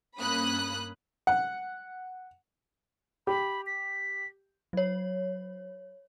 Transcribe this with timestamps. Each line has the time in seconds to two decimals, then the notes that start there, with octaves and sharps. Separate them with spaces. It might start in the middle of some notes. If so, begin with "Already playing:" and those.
0.20 G2 A#3 C#4 B5 D#6 F#6
1.27 F#5
3.27 G4 B5
3.66 B6
4.73 F#3 C#5